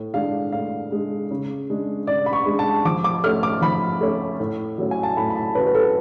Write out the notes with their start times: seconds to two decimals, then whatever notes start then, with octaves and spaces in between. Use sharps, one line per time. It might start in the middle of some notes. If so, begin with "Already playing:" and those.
Already playing: A2
0.14 G#3 D4 F5
0.52 A2 F5
0.92 G#3 D4
1.31 C#3
1.69 G#3 D4
2.07 C#3 D5
2.26 B5
2.33 C#6
2.46 G#3 D4
2.59 A5
2.85 F3 D6
3.04 D6
3.24 A3 C#4 F6
3.43 D6
3.61 F3 B5
4.01 A3 C#4
4.40 A2
4.78 F#3 A3 C#4
4.91 G#5
5.03 A5
5.17 A2 B5
5.30 B5
5.36 A5
5.55 F#3 A3 C#4 B4
5.67 B4
5.75 A4